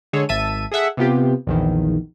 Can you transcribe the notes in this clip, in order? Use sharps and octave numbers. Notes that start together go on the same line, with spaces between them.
D3 G#3 G#4 A4 C#5
G#1 E5 A5 D#7
G#4 A4 E5 F#5
C3 B3 F4 G4
A#1 E2 D#3